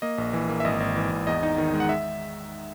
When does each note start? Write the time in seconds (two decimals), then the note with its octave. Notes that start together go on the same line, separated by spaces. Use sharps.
0.02 A#3 D#5
0.18 A#1
0.33 E3
0.49 A#3
0.60 E5
0.65 G#1 D#5
0.80 G#1
0.96 E3
1.11 G#1
1.27 E2 D#5
1.43 D#4
1.58 D#3
1.74 G#3
1.80 F#5
1.89 E5